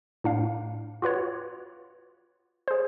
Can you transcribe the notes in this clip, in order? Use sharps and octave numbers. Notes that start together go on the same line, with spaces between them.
A2 D4 F5
F4 F#4 B4 C#5
G#4 C5